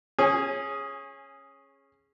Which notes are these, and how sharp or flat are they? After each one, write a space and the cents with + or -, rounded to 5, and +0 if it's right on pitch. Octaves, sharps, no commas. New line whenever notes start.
C#4 -15 G#4 +0 G#5 -30